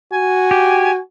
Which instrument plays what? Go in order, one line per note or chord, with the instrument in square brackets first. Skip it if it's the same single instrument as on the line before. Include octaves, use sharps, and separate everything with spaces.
[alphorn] F#4 [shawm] G#5
[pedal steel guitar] G4